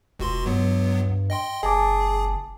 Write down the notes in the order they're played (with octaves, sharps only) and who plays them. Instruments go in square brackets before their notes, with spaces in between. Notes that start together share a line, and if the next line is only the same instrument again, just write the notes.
[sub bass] E1 [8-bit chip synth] C#2 F#4 C6
[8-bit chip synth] C#2 F#3 B3 [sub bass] G2
[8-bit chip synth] D#5 G5 C6
[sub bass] F#1 [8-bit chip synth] G#4 [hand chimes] G#5 A5 D6